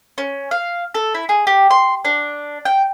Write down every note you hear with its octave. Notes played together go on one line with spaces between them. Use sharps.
C#4
F5
A4
E4
G#4
G4
C6
D4
G5